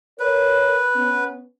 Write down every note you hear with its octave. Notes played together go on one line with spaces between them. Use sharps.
A#4 B4 C#5
B3 C#4